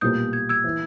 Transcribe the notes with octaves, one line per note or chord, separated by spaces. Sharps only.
B1 A#2 G3 A#3 D#6 G6
G#6
E6 G#6
E3